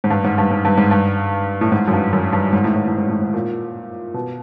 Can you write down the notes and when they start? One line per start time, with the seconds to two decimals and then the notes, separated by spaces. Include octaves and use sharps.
0.04 G#2
0.10 G2
0.24 G#2
0.38 G2
0.51 G#2
0.65 G2
0.78 G#2
0.91 G2
1.61 A2
1.72 G#2
1.88 F#2
1.93 G2
2.13 F#2
2.33 G2
2.53 G#2
2.64 A2
2.76 G#2
2.87 A2
2.98 G#2
3.10 A2
3.22 G#2
3.34 A#2
4.14 B2